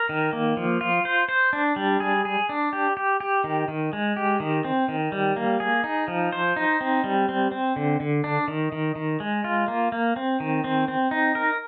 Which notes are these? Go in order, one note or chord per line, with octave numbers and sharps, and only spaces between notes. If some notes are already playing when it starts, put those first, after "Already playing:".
Already playing: A#4
D#3
A#3
F3
F4
C5
C5
D4
G3
G#4
G#4
D4
G4
G4
G4
D#3
D#3
G#3
G4
D#3
C4
D#3
G3
A#3
G#4
D#4
F3
C5
D#4
C4
G3
C4
C4
D3
D3
D4
D#3
D#3
D#3
G#3
F4
A#3
A#3
C4
D#3
C4
C4
D#4
A#4